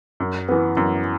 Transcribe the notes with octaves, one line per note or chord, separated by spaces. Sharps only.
F#2
E3 B3
F#2